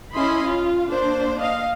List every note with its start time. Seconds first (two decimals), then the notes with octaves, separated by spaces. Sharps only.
0.13 C#4 E4 D#5 B5 C6
0.45 F4
0.90 A#3 D4 C5
1.40 D#5 F5